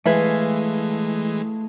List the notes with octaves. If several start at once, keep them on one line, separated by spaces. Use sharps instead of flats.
E3 G#3 A3 B4 E5 F5 G#5